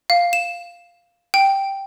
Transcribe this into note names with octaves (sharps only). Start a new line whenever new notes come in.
F5
E7
G5